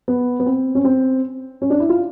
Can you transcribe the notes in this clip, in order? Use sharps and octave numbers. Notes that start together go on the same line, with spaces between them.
B3
B3
C4
C#4
C4
C#4
D4
E4
F4